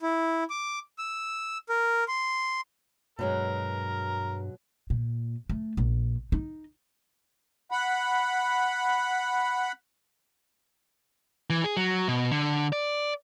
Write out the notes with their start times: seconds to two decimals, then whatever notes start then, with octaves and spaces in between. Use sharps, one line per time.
0.02 E4
0.50 D6
0.98 E6
1.69 A#4
2.08 C6
3.19 G2 B2 F#3 G#3 A#4
4.90 A#2
5.49 A3
5.77 A#1
6.32 D#4
7.71 F#5 B5
11.50 E3
11.64 G#4
11.77 F#3
12.08 B2
12.31 D3
12.73 D5